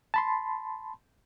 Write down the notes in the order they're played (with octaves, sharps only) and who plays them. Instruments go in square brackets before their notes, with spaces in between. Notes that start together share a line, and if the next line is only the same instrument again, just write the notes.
[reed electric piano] A5 B5 C6